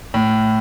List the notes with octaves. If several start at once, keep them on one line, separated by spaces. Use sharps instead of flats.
A2